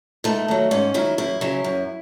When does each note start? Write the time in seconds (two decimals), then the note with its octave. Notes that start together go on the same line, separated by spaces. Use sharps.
0.24 G#2 A3
0.48 D#3 F#3
0.71 G#2 C#4
0.94 D#3 F#3 E4
1.18 F#2 E4
1.41 C#3 F#3
1.64 F#2